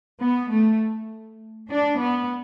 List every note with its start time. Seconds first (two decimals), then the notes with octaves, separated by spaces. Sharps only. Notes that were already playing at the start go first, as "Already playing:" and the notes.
0.21 B3
0.51 A3
1.70 D4
1.98 B3